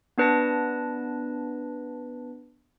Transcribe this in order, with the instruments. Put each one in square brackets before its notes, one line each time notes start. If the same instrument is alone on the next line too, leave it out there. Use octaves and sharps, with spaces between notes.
[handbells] B3 D4 B4 A5 A#6